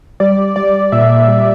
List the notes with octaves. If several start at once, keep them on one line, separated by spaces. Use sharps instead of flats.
G3 D5
G3 D5
A#2 E5
G3